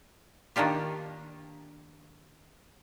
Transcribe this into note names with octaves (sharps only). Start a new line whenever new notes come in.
D#3 A#3 D4 F4 G4